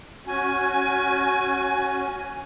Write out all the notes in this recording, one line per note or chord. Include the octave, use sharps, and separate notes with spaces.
C#4 F#4 G#5